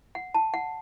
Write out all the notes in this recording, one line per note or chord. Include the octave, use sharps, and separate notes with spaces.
F#5
A5
F#5